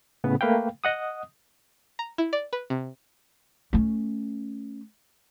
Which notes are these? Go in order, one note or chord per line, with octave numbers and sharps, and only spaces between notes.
A2 C#3 B3
A3 A#3 B4 F5 G5
D#5 F#5 D#6
A#5
E4
D5
B4
C3
A3 C#4